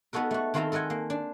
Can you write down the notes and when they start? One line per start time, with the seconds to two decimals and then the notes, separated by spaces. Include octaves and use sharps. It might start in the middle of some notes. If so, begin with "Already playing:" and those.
0.13 B3 D#4 F#4 A4 A#4
0.31 A3 F#4
0.54 D#3 C4 E4 F4 A4 A#5
0.72 A4 A#4 D#5 F#5 G#5
0.90 A#3
1.10 D4